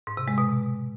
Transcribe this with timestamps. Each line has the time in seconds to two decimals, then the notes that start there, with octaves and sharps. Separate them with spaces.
0.07 G#2
0.17 C3
0.28 G#3
0.38 B2